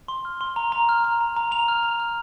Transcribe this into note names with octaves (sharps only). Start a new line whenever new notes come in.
C6
F6
C6
A#5
A#5
F6
A#5
A#5
A#5
A#5 F7
F6
A#5
F6